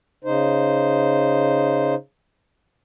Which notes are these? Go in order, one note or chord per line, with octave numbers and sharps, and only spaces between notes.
C#3 D#4 C5